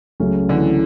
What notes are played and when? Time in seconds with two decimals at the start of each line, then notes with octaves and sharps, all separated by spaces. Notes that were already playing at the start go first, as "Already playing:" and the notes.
0.20 C#2 C#3 F#3 A3 C#4
0.49 D3 E3